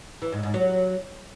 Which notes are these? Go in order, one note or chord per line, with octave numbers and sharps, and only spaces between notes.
E3
G#2
G#2
F#3